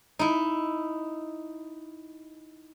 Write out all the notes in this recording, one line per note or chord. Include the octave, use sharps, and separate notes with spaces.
D#4 E4